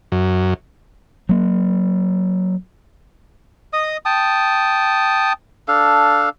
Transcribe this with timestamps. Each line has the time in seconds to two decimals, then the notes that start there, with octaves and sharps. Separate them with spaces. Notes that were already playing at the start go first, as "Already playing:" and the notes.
0.12 F#2
1.29 F#3 A#3
3.73 D#5 D#6
4.05 G5 A5 D#6
5.68 D4 A4 F5